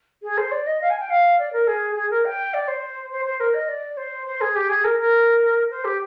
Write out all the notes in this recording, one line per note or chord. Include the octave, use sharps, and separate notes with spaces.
G#4
C5
D5
D#5
F5
G#5
G5
F5
D5
A#4
G#4
G#4
A#4
G5
D5
C5
C5
C5
A#4
D#5
D5
C5
C5
G#4
G4
G#4
A#4
A#4
C5
G4